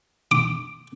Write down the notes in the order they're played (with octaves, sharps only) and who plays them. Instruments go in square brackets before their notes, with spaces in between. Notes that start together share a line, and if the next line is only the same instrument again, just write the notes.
[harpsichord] D6